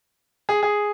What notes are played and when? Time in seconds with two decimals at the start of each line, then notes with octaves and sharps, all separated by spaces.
0.49 G#4
0.63 G#4